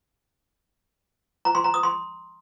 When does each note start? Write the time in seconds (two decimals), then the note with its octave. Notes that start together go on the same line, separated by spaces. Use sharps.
1.45 A#5
1.55 C6
1.64 A#5
1.74 D#6
1.83 C6